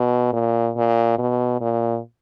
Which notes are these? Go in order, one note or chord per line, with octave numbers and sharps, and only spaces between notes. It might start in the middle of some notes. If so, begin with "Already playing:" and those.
Already playing: B2
A#2
A#2
B2
A#2